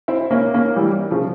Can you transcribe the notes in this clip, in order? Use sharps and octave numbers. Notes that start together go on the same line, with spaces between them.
C4 E4
A#3 C#4
A#3 C#4
E3 G3
C#3 F3